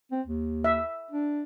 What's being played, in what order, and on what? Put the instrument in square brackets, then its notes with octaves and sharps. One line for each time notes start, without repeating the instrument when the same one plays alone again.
[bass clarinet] C4
D#2
[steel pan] E5
[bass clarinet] D4